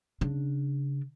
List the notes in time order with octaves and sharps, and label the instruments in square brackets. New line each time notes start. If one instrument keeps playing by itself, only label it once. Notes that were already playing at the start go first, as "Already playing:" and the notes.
[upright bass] C#3 D4